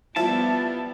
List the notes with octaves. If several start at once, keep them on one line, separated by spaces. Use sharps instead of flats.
F3 G3 B3 E4 A5